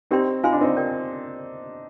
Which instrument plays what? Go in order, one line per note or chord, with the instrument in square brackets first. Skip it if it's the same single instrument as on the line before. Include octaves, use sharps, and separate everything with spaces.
[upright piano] C4 D#4 [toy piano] G4 D5 G5 C6
[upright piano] D#4 [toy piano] F4 C5 F5 G#5 C6
[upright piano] D4
C4 D#4
[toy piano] A#4 D5 G5